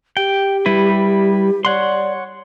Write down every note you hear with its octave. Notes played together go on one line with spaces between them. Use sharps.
G4 G5
G3 E4 B4
C#5 D5 F#5 C6